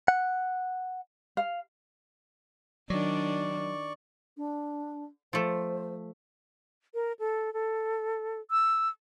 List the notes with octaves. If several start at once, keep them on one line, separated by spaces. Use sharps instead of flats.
F#5
F5
D#3 F#3 D4 D5 C#6
D4
F3 A3 C5
A#4
A4
A4
E6